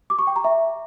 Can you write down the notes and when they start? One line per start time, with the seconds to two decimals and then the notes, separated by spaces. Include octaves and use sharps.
0.10 D6
0.19 C#6
0.27 G5
0.36 A#5
0.44 E5